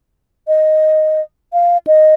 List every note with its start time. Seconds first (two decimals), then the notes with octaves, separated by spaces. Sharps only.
0.48 D#5
1.53 F5
1.87 D#5